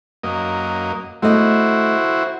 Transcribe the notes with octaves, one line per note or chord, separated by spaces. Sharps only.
F#2 A#3 D#5
A3 E4 F#4 C5 D#5